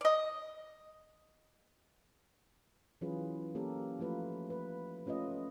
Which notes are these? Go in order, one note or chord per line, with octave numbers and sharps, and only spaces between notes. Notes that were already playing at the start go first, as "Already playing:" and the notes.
D5 D#5
E3 F#3 C#4 F4 G#4 B4
A#3 C#4 G4 A4 A#4
F3 A3 F4 B4
B4
A3 C#4 F4 B4 D#5